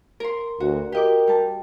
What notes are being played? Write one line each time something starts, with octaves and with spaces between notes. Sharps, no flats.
A#4 C6
D2 F#4
G4 A#4 D#5 D6
G3 A5